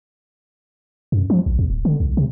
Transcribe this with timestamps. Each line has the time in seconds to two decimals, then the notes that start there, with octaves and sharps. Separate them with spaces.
1.12 F#2
1.30 F3
1.46 A#1
1.59 E2
1.70 D1
1.85 D3
2.00 C2
2.17 C3